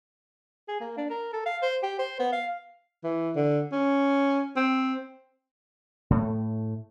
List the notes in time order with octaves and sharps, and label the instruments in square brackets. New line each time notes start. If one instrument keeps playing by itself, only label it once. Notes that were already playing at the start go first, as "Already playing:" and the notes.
[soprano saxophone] G#4
A#3
D4
A#4
A4
F5
C5
G4
C5
B3
F5
[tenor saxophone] E3
D3
C#4
C4
[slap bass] A2 A3